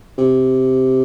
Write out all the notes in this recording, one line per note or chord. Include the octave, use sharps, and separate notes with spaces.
C3